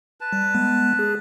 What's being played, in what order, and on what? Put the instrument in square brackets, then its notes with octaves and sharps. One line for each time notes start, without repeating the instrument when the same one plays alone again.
[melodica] B4 A5
[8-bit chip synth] G3
G#3 B3
G#4